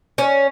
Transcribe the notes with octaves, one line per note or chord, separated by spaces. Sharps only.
C#4